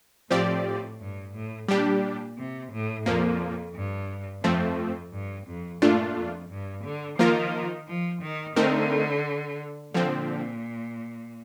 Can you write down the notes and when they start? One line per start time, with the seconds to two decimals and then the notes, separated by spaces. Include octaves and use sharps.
0.31 A2 F3 C4 G4 D5
1.00 G2
1.34 A2
1.68 A#2 G3 D4 G4
2.38 C3
2.72 A2
3.06 F2 A#2 F3 A#3
3.75 G2
4.43 F2 F3 A3 C4
5.13 G2
5.47 F2
5.82 G2 A#2 A3 D4 F4
6.16 F2
6.50 G2
6.84 D3
7.18 D#3 F3 A#3 F4 A#4
7.88 F3
8.22 D#3
8.56 D3 A3 C4 D#4 A#4
9.94 A#2 D3 F3 C4